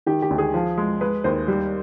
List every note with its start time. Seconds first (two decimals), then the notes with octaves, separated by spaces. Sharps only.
0.06 D#3 G4
0.22 G4
0.31 D2
0.38 G#4
0.54 F3
0.77 G#3
1.01 G#3 B4
1.24 D#2 C5
1.48 G3